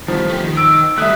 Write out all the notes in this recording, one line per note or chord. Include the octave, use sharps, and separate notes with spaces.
D#3 F3 G3 B3
A3 G4
D#3
E6 D7
G3 A3 E5 D#6 F#6